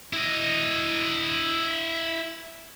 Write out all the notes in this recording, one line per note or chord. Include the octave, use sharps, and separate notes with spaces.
E4 D#5